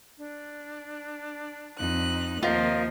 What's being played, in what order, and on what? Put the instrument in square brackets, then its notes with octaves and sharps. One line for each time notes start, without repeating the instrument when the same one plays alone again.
[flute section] D4
[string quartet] F2 D#4 F#6
[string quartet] D#2 C3 [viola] F3 [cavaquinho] F4 [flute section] A#4 D#5